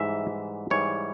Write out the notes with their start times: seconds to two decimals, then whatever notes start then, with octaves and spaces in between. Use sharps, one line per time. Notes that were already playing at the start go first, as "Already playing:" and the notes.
Already playing: G#2 E3 G3 E5
0.70 G#2 E3 G3 C#5